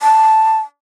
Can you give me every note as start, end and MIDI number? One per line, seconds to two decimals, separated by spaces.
0.01 0.57 81